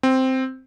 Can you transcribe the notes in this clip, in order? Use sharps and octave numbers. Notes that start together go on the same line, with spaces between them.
C4